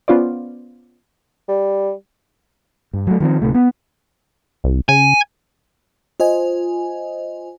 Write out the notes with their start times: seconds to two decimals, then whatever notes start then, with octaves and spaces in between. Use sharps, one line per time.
0.08 B3 C#4 F4 C5 D5
1.48 G3
2.93 G2
3.07 F#3 A3
3.20 D#3 F3 G#3 C4
3.42 D1 C3 A3
3.54 B3
4.64 C2
4.89 C#3 G#5
6.20 F4 C5 D#5 G#5